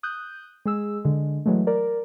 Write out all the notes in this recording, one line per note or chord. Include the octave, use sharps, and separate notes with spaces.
D#6 F#6 G6
G#3 G#4 E6
D3 G#3
E3 F#3 G#3 A3
A#4 D5